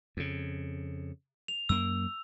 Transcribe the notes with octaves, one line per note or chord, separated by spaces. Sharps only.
F2 C#3
F7
F#2 A#3 E6